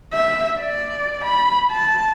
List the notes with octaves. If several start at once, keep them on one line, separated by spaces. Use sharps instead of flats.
E5
D5
B5
A5